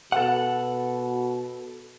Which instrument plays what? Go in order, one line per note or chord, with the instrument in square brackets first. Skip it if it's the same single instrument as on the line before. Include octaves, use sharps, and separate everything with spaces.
[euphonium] B2 [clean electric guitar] A4 F#5